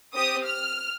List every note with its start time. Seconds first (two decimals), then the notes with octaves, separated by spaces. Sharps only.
0.15 C4 G4 D#6
0.46 F6